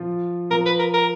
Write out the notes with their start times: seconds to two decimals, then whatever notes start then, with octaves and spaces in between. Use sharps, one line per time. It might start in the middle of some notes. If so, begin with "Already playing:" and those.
Already playing: F3 F4
0.50 F3 F4 A#4
0.66 B4
0.79 A#4
0.94 A#4